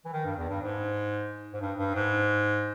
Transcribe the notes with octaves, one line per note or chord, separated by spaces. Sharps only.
E3
D#3
G2
E2
G2
G#2
G#2
G2
G2
G#2